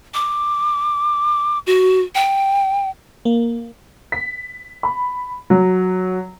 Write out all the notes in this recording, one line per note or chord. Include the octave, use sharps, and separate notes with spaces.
D6
F#4
G5
A#3
B6
B5
F#3